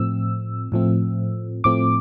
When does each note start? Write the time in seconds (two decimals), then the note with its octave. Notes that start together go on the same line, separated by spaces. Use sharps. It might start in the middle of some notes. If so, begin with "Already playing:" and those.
Already playing: A2 F3 A3 C4 E6
0.72 A2 F3 A3 C4
1.64 A2 F3 A3 C4 D6